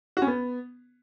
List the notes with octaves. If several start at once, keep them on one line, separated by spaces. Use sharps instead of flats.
F#4
C#4
B3